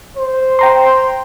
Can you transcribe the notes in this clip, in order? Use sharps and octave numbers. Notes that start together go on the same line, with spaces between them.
C5
G5 A#5 C6